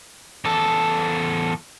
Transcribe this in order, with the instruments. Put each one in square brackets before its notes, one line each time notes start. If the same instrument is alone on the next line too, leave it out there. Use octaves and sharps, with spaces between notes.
[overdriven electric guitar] E2 A4